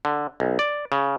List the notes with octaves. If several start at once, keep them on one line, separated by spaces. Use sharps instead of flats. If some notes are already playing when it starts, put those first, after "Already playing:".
D3
B1
D5
C#3